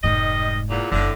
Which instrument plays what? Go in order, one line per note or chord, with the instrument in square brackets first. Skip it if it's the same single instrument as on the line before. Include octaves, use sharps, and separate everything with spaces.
[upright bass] F1 G#2 [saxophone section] D#3 G3 D#5
[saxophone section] E2 A#2
[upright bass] F#1 C4 [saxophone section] A2 D3